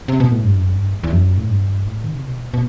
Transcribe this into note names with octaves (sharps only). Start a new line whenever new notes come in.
C3
B2
A2
G2
F#2
G2
E2
F#2
A2
G2
A2
D#3
C3
B2
B2